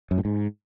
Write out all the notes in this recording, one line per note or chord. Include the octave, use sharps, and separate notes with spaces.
F#2
A2
G#2